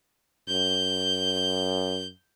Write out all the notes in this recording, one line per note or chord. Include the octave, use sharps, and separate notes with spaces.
F#2 G6